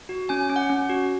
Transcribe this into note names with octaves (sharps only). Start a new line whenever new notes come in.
F#4
C#4 G#5
C#4
F#5
C#4
F#4